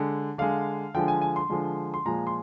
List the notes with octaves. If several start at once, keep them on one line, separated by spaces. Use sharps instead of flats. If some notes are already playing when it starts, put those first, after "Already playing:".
Already playing: D3 G#3
D3 G#3 F5
D3 F3 G#3 G5
G#5
G#5
C6
D3 F3 G#3
C6
A#2 F3 G#3 A#5
C6